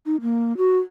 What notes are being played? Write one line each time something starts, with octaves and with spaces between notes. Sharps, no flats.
D#4
A#3
F#4